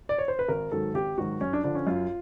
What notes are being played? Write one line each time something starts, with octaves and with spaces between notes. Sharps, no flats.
D5
C#5
C5
B4
G#1 A#4
G#2 D#3 F#3 A4
G#1 G4
G#2 D#3 F#3 F#4
F#2 C#4
D4
D3 F3 D4
C#4
F#2 F4